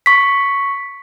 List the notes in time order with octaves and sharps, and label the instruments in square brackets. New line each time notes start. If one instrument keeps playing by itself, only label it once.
[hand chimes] C#6 B6